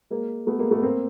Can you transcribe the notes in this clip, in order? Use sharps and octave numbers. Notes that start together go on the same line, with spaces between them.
G#3 A#3
A3 B3
G#3 A#3
A3 B3
A#3 C4